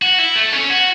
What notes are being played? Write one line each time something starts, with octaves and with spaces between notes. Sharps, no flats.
F#4
E4
A3
C#4
F#4